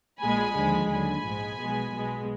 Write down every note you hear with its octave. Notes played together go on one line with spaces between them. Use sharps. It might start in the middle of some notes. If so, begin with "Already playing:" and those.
A#1 A#2 G#3 G#5 B5
D#2 D3 F3 G#3
D#2 D3 F#3 G#5 B5
A#1 G#2 F3 G#3
B1 B2 G#3
B1 B2 G#3